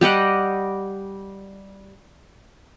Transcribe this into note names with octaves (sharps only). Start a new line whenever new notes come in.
G3 G4 D#5 F#5